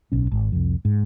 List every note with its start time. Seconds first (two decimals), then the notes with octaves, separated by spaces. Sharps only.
0.12 D1 B1 C#4
0.32 G#1
0.52 C2 F2
0.85 G#2